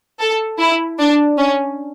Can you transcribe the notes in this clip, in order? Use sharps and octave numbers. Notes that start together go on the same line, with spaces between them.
A4
E4
D4
C#4